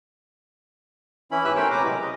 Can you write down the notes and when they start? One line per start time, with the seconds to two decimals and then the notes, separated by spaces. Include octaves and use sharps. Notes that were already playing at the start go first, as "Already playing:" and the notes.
1.31 E3 C#4 E4 B5
1.45 G#2 G4 B4 E5 E6 F#6
1.56 A3 C#4 A#4 C5 C#5 G5
1.71 A2 C3 B4 A#5 D6
1.84 C3 F#3 G#3
2.01 C#3 D#5